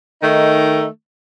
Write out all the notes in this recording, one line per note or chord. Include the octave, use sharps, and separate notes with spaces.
D#3 A3 D#4